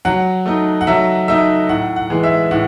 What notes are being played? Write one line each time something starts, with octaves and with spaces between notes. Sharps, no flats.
F#3 F#5
A3 D#4
F#5
F#3 E5
A3 D#4 E5
A2 F#5
F#5
E3 G#3
E5
A2 F#5